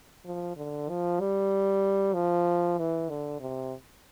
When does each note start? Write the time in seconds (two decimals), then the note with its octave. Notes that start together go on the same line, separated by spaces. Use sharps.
0.25 F3
0.57 D3
0.89 F3
1.20 G3
2.14 F3
2.78 E3
3.09 D3
3.40 C3